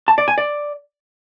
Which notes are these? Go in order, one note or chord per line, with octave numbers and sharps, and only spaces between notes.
A5
D5
G#5
D5